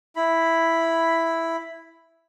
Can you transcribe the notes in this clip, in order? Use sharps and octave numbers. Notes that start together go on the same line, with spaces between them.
E4 B5